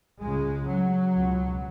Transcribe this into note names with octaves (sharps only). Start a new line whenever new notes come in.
C#2 C#3 G#3
F#3
C#2 B2